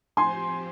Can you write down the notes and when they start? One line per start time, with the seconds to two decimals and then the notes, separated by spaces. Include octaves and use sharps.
0.17 F3 C4 G4 C5 G#5 C6